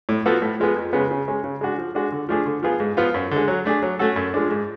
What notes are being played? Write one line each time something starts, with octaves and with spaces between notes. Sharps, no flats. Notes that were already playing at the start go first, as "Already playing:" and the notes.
A2
F3 B3 F#4 A4
A2
F3 G#3 B3
F2
C#3 G#3 B3
C#3
G#3 C#4
C#3
G#3 D4 F#4
F3
G#3 D4 F#4
D3
F3 A3 D4 G#4
D3
F3 B3 F4 G#4
G#2
F3 B3 F4
F#2
D3 G#3
F#3
A3 D4 G#4
F#3
A3 C#4 F#4 A4
F#2
F3 G#3 D4
G#2